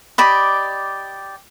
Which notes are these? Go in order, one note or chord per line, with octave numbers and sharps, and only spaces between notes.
G4 D5 D#5 B5